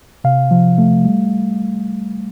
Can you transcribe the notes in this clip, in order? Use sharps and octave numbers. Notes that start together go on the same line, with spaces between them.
C3 F5
F3
A3
G3